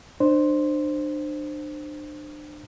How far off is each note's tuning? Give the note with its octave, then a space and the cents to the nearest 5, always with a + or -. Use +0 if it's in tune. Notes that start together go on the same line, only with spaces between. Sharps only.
D4 +35 C5 +5